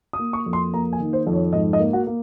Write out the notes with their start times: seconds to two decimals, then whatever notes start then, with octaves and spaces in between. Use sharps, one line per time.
0.13 D#6
0.19 A#3
0.33 C#6
0.46 F2
0.53 C6
0.74 A#3 A#5
0.93 G#5
1.00 D#3
1.13 C5
1.27 F2
1.33 C#5
1.53 G#2 D#5
1.73 D#5
1.80 A#3
1.93 F#4
2.07 A#3